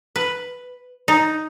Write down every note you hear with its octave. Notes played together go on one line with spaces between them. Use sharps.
B4
D#4